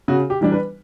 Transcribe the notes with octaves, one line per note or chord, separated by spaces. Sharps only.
C#3 F#4
G4
E3 G3 D4
B4